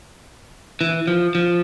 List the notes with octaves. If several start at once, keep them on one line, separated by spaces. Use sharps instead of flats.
E3
F3
F3